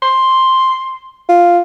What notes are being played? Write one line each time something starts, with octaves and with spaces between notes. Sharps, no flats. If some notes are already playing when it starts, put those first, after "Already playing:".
C6
F4